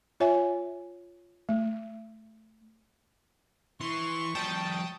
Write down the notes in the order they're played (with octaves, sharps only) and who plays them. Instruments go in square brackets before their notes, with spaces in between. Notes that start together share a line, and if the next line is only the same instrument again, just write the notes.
[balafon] F4 C#5 E5 G#5
A3
[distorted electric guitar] E3 [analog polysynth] C6 [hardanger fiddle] C#6
[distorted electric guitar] F3 G3 [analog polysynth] G5 A5 D#6